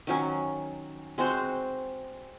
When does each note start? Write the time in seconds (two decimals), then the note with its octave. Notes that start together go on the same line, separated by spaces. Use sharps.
0.07 D#3 F#3 C#4
1.18 G#3 C4 F#4 C5